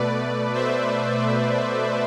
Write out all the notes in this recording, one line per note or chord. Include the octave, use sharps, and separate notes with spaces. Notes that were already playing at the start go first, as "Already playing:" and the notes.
Already playing: B2 A3 B4 D5
C5 E5